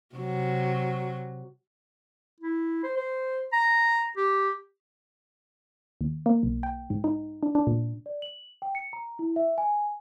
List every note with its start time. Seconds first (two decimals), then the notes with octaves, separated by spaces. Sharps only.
0.15 C3 F#3
2.40 E4
2.83 C5
2.97 C5
3.53 A#5
4.17 G4
6.01 D#2
6.26 A#3
6.43 B1
6.63 G5
6.90 G#2
7.04 D#4
7.43 D4
7.55 D4
7.67 A#2
8.06 D5
8.22 F#7
8.62 G5
8.75 C#7
8.93 A#5
9.19 E4
9.36 E5
9.58 G#5